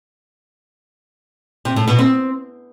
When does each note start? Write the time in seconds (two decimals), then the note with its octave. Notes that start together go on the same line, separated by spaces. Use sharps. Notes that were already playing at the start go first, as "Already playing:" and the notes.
1.65 C3
1.76 A2
1.88 B2
1.99 C4